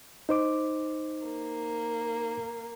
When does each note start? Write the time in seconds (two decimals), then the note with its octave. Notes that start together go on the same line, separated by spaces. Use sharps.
0.29 D#4 C5 D6
1.27 A#3